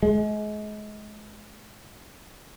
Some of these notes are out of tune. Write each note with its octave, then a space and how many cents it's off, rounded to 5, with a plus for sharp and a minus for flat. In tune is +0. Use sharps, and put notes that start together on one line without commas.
G#3 +30